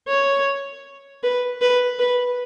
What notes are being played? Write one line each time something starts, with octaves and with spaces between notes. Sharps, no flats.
C#5
B4
B4
B4